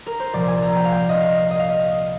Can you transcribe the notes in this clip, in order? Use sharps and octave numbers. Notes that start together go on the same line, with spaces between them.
A#4
C5
C2 A#2 F3 D5
G#5
A#5
G5
F5
G5
D#5
F5
D#5
F5
D#5